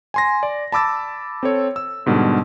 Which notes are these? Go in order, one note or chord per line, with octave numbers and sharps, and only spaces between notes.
G#5 C6 A#6
D5
A5 B5 D6 E6 A6
C4 A4 C#5
E6
G#2 B2 D3 G3